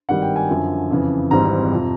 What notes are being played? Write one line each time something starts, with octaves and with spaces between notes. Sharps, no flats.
G#1 G2 D#3 G3 F#5
G5
G#5
F#2 D3 F3
F2 C#3 E3
G#1 G#2 E3 G3 C4 A#5
F2 C3 F3